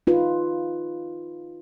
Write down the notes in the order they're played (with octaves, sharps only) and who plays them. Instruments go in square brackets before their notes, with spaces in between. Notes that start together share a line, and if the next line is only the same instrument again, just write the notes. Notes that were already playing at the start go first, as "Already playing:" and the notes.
[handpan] D#4 F4 B4